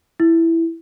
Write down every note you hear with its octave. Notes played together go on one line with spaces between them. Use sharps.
E4